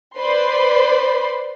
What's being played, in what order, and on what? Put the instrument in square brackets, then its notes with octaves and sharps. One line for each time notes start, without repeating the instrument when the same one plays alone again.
[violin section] B4 C5 D5 B5 C6